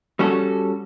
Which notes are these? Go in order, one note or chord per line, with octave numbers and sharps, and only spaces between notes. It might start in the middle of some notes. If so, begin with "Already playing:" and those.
G3 C#4 F#4 A4